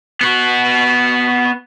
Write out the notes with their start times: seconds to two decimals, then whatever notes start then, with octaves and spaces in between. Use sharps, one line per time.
0.21 B3 F#4